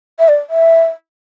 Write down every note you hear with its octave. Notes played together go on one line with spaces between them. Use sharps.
E5
D5
E5